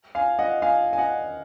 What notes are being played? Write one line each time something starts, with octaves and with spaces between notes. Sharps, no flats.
F5 G#5
D#5 F#5
F5 G#5
G#5
D#5 F#5